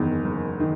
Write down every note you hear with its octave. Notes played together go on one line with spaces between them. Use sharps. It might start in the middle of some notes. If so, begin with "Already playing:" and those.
Already playing: F#1 E2 D#3
F#1
D#3